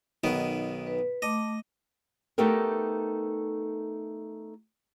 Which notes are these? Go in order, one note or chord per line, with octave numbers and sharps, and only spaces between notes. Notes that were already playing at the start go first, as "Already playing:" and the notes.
B1 D#3 B3
B4
A3 D#5 D6
A3 B3 D#4 G4 A4 A#4